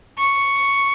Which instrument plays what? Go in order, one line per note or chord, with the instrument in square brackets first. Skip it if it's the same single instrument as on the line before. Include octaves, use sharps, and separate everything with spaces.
[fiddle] C#6